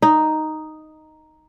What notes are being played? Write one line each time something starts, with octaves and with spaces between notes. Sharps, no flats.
D#4